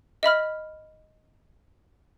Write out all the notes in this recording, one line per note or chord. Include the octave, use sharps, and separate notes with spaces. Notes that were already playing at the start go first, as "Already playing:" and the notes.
D#5 E5 B5 F6